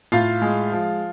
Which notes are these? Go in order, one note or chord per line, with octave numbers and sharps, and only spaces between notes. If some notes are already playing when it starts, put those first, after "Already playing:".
A2 F4 F5
G#3
F3